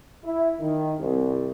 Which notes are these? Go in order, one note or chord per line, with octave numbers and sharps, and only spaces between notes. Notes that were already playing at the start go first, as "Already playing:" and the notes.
E4
D#3
C2